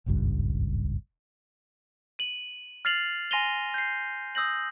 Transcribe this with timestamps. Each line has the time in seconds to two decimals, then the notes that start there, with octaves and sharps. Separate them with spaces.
0.06 D#1 G#1 C#2 G2
2.19 D#7 F#7
2.85 F6 A6 C7 F7 F#7
3.31 G#5 C6 A#6 D#7 F7 G7
3.74 G6 C7
4.35 D#6 E6 G6 A#6 F#7